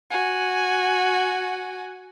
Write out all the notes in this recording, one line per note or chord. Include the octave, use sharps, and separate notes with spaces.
F#4 G#5